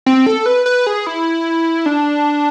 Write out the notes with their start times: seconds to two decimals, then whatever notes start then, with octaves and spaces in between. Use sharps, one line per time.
0.06 C4
0.26 A4
0.46 B4
0.66 B4
0.87 G#4
1.07 E4
1.86 D4